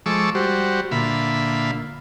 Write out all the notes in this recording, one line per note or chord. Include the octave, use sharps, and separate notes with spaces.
F3 G#3 A4 C#6 D6 E6
G3 F#4 C5
A#2 D3 F4 E5 B5